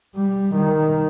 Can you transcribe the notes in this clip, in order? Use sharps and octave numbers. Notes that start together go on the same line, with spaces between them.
G3
D#3